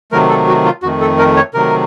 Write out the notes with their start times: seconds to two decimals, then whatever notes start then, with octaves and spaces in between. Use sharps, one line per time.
0.12 C3 D#3 F#3 A3 A#4
0.30 A4
0.48 F#4
0.65 F4
0.83 F2 D#3 A3 F#4
1.01 A4
1.19 A#4
1.37 C#5
1.54 C3 D#3 F#3 A3 A#4